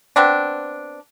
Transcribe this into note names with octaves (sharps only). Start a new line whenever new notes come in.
B3 C4 D4